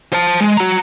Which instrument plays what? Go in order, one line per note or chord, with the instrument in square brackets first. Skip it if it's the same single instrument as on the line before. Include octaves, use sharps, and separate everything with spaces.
[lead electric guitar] C5 A5
G#3
F#4 A#5